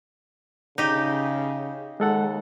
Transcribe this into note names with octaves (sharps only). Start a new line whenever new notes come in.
C#3 D#4 G4
D#2 G#3 A4 F#5